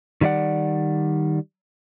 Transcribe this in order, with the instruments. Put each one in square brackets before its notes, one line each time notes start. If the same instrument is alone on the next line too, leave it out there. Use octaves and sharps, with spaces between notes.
[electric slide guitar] D#3 G3 E4 D5 F#5